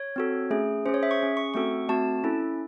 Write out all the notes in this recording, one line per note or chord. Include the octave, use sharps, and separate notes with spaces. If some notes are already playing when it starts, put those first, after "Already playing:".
Already playing: C#5
C4 F#4 A4
A3 C#4 G#4
C#4 G#4 C5
C#5
E5
C#6
C#4 G#4
C#6
A3 C4 F#4 A4 C#6
A3 C4 F#4 A5
C#4 E4 A4